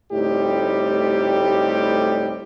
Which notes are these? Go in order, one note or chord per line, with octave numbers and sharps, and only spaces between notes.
D2 A2 G3 C4 D#4 G4